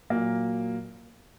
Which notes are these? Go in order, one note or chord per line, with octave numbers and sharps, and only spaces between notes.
A#2 F#3 A#3